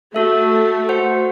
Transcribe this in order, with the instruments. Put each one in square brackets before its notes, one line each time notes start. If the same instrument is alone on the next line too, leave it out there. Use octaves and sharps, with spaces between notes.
[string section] A3 [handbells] F#4 A4 E5
[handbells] F#4 C5 F#5